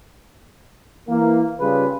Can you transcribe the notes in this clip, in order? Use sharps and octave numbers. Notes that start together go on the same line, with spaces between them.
E3 A#3
C#3 G3 F4 G#4 B4